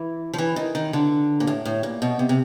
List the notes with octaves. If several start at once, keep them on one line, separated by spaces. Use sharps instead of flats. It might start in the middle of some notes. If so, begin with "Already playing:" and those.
Already playing: E3
F3
E3
D#3
D#3
D3
A#2
A2
A2
A#2
B2
C3
C3